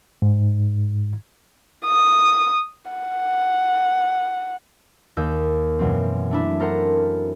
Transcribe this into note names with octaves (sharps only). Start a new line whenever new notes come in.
G#2
D#6
F#5
D#2 D#5 E6 G6
F#2 B2 E3 F#3 C4
A3 D4 E4
A4 A#4 C5 F#5 A#5